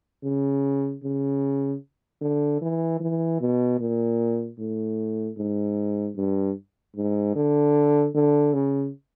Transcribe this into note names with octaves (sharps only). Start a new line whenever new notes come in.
C#3
C#3
D3
E3
E3
B2
A#2
A2
G#2
G2
G#2
D3
D3
C#3